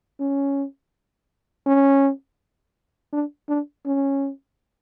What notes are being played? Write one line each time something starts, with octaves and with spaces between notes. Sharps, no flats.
C#4
C#4
D4
D4
C#4